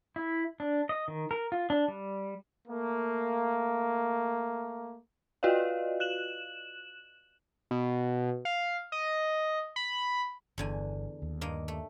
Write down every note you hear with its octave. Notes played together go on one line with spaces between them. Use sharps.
E4
D4
D#5
D#3
A#4
F4
D4
G3
A3 A#3
F4 F#4 B4 D5 D#5 F5
F#6 E7 F#7
B2
F5
D#5
B5
G1 E2 D3 G#5
D#2
G2 A#3 D#5
A3